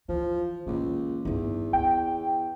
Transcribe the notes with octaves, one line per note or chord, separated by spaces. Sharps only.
E3 F3
C#2 A#2 D#3
E2 G2 D#4
B3 G5